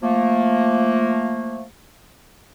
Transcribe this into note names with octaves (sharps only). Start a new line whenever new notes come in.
F3 A3 A#3